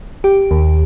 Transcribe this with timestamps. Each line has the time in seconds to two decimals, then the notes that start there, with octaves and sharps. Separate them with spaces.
0.24 G4
0.51 D#2